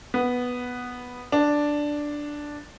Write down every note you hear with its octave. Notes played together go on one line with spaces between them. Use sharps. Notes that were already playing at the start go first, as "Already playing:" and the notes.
B3
D4